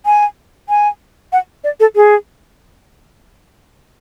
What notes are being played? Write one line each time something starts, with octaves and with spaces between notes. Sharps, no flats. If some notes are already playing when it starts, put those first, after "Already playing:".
G#5
G#5
F#5
D5
A4
G#4